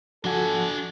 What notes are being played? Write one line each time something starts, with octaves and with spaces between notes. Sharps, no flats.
F3 D4 F#4 A4 F#5 G#5